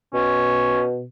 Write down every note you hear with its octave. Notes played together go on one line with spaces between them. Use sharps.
B2 C#4